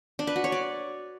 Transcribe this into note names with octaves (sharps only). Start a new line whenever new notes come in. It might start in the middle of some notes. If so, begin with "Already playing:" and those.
D4
B4
F#4
C#5
D5